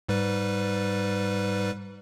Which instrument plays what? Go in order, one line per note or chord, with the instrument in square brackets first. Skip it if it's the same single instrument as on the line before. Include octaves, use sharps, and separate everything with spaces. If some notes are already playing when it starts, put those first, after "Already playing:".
[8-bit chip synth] G#2 G3 B4